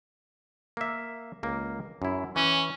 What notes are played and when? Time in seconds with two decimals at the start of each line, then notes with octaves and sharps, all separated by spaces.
0.77 A#3 E5
1.43 C#2 A#3
2.02 F#2 E4
2.36 E3 C#4